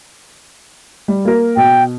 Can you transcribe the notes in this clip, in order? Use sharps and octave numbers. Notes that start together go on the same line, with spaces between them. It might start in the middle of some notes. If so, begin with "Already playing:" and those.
G3
A#3 A#4
B2 G5